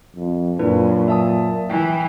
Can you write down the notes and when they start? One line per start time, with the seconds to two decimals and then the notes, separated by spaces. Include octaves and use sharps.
0.16 F2
0.59 F#2 A#2 D4 E4 B4
1.08 E5 A5 D#6
1.70 E3 G5